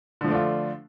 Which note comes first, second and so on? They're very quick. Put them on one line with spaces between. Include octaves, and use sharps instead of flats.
D3 F3 A3 D4 F4